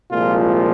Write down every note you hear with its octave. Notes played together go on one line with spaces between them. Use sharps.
C2 A#2 F3 G#3 F4